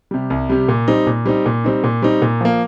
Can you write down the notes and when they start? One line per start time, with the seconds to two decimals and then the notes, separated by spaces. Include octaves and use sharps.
0.11 C3 G3
0.30 C2
0.50 C3 G3
0.69 A#2
0.88 G3 C4 D#4
1.07 A#2
1.26 G3 C4 D#4
1.46 A#2
1.64 G3 C4 D#4
1.84 A#2
2.02 G3 C4 D#4
2.22 A#2
2.41 F3 A#3